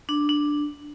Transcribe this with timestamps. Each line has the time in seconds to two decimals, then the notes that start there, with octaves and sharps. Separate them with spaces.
0.09 D4
0.29 D4